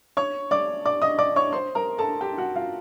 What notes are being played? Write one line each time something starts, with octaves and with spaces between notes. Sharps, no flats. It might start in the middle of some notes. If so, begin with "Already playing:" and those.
C#5 C#6
D5 D6
D5 D6
D#5 D#6
D5 D6
C#5 C#6
C5 C6
A#4 A#5
A4 A5
G4 G5
F#4 F#5
F4 F5